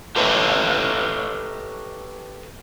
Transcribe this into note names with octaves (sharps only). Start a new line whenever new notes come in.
G4 A4 B4 C#5 D#5 E5